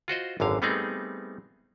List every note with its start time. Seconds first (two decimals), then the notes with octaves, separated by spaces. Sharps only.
0.08 F4 F#4 C5 D#5
0.40 G#1 F#2 D3 F5
0.62 G3 A3 B3 C4 D#4 G#4